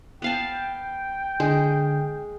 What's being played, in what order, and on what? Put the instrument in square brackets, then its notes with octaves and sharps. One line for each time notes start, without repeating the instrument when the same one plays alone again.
[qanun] B3 F5 A5 [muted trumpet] G5
[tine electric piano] D3 [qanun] G#3